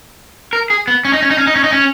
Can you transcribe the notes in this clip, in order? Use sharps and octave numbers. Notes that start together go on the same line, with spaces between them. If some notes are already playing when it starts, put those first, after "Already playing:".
A#4
G#4
B3
C#4
D#4
C#4
D#4
C#4
D#4
C#4
D#4
C#4